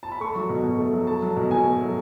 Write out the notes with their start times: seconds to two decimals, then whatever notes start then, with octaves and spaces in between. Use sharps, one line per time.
0.03 A5
0.12 B5
0.20 A3 C#6
0.35 F#3
0.49 B2
0.64 B2
0.78 A3
0.93 F#3
1.07 A3 A5
1.22 F#3
1.36 B2
1.51 B2 G#5
1.66 A3
1.81 F#3